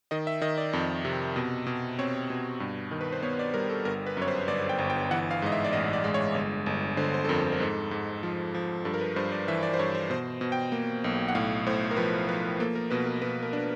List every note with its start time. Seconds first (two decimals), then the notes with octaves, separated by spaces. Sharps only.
0.11 D#3 D#5
0.27 E5
0.41 D#3 D#5
0.58 D5
0.73 F2
1.05 C3
1.36 B2
1.67 B2
1.99 C4 C#5
2.30 B2
2.60 G2
2.91 D#3
3.01 B4
3.12 C5
3.22 B3 C#5
3.39 D5
3.54 G3 A#4
3.70 A4
3.85 G1 A#4
4.07 B4
4.17 F#2 C#5
4.28 C5
4.48 G1 D5
4.69 G5
4.79 G1
4.90 G5
5.11 E3 F#5
5.31 F5
5.42 G#2 D#5
5.52 E5
5.64 D5
5.73 A1 D#5
5.93 D5
6.04 G#3
6.14 C#5
6.35 G1
6.66 G1
6.97 D3 C5
7.14 C5
7.24 A4
7.28 F2 A#4
7.44 A4
7.52 A#4
7.60 G#2 A4
7.91 G#2
8.23 F3
8.55 F3
8.85 G2 A4
8.94 A#4
9.01 B4
9.16 G2 C5
9.32 D5
9.48 E3 E5
9.63 D5
9.74 C5
9.79 G2 C#5
9.95 C5
10.10 B2 C5
10.41 B2
10.52 G5
10.72 A#3
11.04 B1
11.28 F#5
11.35 A2 F5
11.66 A2 C5
11.91 A#4
11.97 F3 B4
12.28 F3 B4
12.60 A#3 A4
12.75 A#4
12.90 B2 B4
13.06 A#4
13.22 B2 B4
13.43 A#4
13.53 D4